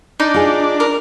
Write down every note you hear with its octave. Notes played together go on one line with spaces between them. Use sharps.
D4 D#4
F4 G#4
A#4